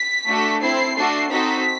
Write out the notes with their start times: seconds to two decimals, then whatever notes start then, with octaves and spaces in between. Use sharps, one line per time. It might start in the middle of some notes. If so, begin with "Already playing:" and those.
Already playing: B6
0.27 A3 D4 F#4 A4
0.61 C4 E4 A4 C7
0.96 A3 D4 F#4 A4
1.31 C4 D#4 F#4 A4 B6